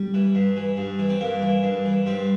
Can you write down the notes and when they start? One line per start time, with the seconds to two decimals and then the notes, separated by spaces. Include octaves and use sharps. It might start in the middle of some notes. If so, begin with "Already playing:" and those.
Already playing: G3
0.14 E3
0.35 G2
0.57 E3
0.77 G2
0.99 E3
1.09 C4
1.21 G2 A#3
1.42 E3
1.63 G2
1.85 E3
2.06 G2 C4